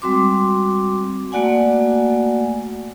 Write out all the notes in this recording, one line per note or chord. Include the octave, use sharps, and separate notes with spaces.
G3 G#3 C4 F#4 C6 D6
A3 A#3 F#4 D5 F#5 G#5